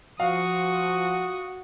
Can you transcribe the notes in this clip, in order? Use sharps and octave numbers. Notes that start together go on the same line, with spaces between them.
F3 F#4 F5 C#6 D#6